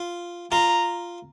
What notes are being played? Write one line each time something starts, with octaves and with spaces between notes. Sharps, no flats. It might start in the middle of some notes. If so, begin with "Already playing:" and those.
Already playing: F4
F4 A#5